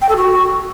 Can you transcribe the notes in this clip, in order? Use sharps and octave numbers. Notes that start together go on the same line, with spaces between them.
G5
A4
F#4